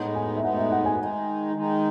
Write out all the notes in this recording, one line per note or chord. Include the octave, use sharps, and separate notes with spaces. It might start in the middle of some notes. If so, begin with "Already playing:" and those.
Already playing: A2 G#3 B3 D#4
G#5
E5
A2 G#3 B3 D#4 F#5
E5
F#5
G#5
D#3 G#3 D#4
D#3 G#3 D#4